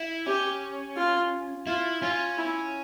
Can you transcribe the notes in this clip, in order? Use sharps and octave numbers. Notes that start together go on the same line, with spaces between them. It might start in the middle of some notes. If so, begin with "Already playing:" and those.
Already playing: E4
C#4 G4
F4
E4 F4
C#4 F4
E4